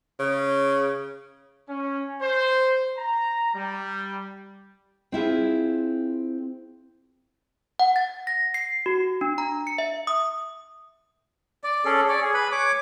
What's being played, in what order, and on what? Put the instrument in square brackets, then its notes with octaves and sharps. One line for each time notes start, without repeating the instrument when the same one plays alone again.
[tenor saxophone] C#3
[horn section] C#4
C5
A#5
G3
[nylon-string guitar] C4 E4 F4 G#4
[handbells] F#5
A6
A#6
C7
F#4
D4
A#5
C#7
E5
D#6
[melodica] D5
C#4 G#4 A4
C#5 D5
G#4
B4 B5
C#5 D6